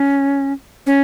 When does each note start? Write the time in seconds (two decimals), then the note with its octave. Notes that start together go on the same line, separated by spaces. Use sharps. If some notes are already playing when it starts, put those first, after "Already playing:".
Already playing: C#4
0.86 C#4